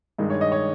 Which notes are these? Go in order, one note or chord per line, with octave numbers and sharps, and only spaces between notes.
G2 D#3 G#3
C#5
D#5
C#5